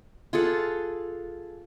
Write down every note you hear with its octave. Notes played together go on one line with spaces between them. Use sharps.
F4 G#4 A4 F#5